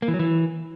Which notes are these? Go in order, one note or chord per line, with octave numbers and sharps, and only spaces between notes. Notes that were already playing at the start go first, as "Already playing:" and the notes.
A#3
E3
F#3
E3